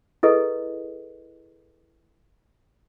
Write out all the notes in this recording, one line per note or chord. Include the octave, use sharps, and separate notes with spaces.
E4 G#4 A4 B4 D#5